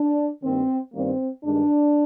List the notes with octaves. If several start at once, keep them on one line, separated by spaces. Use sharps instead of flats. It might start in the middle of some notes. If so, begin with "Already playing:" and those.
Already playing: D4
G2 D#3 A#3 C4
G2 D#3 G3 A#3 C4
G2 D#3 G#3 D4